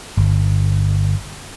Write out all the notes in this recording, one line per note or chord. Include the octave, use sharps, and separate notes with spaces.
G1